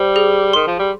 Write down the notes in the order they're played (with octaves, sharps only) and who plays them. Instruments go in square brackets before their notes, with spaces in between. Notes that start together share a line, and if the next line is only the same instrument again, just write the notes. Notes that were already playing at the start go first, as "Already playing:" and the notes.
Already playing: [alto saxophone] G3 [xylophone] C5
[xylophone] G#4
[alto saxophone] D#3 [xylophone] C6
[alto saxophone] F3
G3